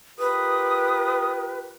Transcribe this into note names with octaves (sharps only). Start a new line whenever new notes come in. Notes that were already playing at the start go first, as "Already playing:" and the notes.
F4 G4 A#4 B4 D#6